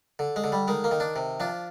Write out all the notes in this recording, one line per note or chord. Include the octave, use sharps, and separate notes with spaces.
D3
G#3
D3
G3
D#3 G#3
A#3
D#3
D4
C3
F3 D4